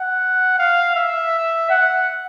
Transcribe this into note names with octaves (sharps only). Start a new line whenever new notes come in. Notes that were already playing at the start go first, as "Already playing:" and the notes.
Already playing: F#5
F5
E5
F#5